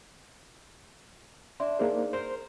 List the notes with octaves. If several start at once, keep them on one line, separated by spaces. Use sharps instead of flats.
D4 D5 E5 C6
A#3 D#4 G#4 C5
A#4 C5